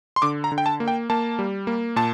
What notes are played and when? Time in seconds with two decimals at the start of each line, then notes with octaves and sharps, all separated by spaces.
0.16 C6
0.22 D3 D6
0.44 A#5
0.52 D3
0.58 G5
0.66 A5
0.80 A#3
0.88 G5
1.10 A#3 A5
1.39 G3
1.67 A#3
1.96 A#2 A5